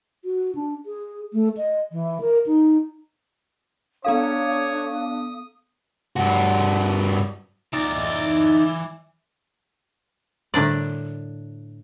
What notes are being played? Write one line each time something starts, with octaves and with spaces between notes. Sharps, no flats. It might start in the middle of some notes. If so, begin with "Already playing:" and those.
F#4
D4
G#4
A3
D#5
E3
A#4
D#4
B3 D4 A4 C#5 F5 D#6
G2 F#4
E3 D#4 D5
A2 D3 G3 D4 D5 A#5